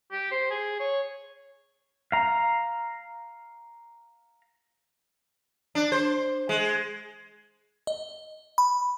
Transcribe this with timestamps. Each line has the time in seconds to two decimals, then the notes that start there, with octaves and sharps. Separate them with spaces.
0.11 G4
0.31 C5
0.50 G#4
0.80 C#5
2.12 F5 A#5
5.75 D4
5.92 C5
6.49 G#3
7.87 D#5
8.58 B5